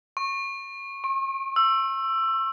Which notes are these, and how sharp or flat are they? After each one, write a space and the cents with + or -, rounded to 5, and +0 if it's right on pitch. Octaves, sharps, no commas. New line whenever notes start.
C#6 -20
C#6 -45
E6 +15